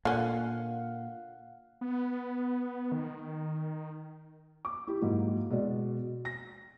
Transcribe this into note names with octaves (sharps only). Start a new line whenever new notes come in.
A#2 D3 C#4 F5 F#5
B3
D#3
D6
E4 G4
G#2 F#3 A#3 E4
B2 G#3 D5
A#6